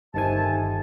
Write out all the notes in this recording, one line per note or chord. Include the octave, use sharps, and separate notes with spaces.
G1 F2 C3 D#3 G#5 A5